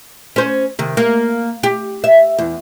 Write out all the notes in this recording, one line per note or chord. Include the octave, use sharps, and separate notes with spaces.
C#4 C5
C3 D#3
A#3
G4
E5
E2